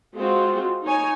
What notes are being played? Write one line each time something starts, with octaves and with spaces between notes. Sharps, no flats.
G#3 C4 F4 F#4
D#4 C#5 G#5